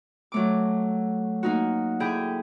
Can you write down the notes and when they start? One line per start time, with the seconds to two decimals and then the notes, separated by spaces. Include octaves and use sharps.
0.32 F#3 A3 D6
1.43 A#3 D#4 F#4
2.00 D3 E4 G#4 G5 G6